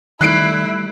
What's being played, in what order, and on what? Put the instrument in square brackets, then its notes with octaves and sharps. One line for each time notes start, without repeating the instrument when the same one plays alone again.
[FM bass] D#3 [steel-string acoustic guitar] G3 A3 [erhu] E4 [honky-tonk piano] F#6 C7 D7